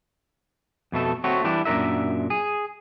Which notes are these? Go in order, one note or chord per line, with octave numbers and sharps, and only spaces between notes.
F2 B2 A3 A4
A3 C4 F#4 C#5
E3 G3 D4 E4
F#2 A#2 D4 A#4 E5
G#4